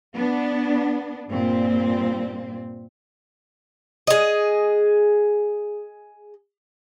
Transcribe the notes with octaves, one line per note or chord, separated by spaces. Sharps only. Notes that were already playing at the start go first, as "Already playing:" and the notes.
B3 D4
G2 A#2 C4
G#4 D#5